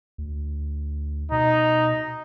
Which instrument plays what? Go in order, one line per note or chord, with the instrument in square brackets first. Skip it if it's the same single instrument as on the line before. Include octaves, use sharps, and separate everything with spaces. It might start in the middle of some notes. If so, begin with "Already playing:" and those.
[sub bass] D2
[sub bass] B2 [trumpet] D#4